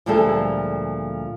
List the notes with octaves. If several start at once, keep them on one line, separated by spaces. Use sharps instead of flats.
D2 A#2 F3 G3 G#3 A4